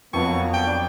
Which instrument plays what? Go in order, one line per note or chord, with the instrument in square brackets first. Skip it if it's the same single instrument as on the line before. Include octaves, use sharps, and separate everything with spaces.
[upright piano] F2 [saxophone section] F#3 A#3 B3 [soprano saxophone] C#6
[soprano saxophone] G5
[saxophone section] D4